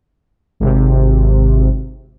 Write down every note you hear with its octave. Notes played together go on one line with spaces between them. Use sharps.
G#1 C3